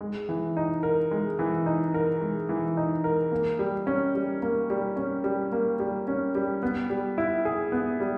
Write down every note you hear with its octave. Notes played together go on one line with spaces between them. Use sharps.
G#3
E3
D#4
A#4
G#3
E3
D#4
A#4
G#3
E3
D#4
A#4
A#3
G3
C#4
G3
A#3
G3
C#4
G3
A#3
G3
C#4
G3
B3
G3
E4
G#4
B3
G3